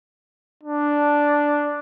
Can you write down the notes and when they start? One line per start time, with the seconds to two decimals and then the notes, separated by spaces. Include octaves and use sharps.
0.64 D4